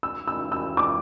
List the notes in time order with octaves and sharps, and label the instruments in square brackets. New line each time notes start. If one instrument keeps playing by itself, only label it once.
[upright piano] E6
E6
E6
D6